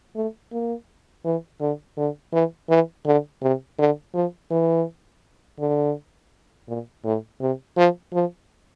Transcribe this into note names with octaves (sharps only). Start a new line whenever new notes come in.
A3
A#3
E3
D3
D3
E3
E3
D3
C3
D3
F3
E3
D3
A#2
A2
C3
F3
F3